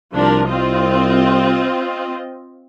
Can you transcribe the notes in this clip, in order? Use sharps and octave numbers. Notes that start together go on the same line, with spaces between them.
C2 F3 D4 A#4
C4 F4 D#5